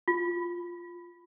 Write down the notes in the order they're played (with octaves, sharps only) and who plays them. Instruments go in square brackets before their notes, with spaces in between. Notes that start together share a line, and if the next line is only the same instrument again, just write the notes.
[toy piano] F4